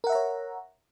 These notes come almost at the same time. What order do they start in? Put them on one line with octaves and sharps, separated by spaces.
A#4 F#5 E5 A#5 C#5